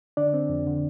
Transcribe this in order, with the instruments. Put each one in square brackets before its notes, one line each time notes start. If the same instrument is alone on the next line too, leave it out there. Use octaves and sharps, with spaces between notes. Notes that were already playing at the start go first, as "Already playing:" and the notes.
[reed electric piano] D3 D4 D5
C4
F2
D3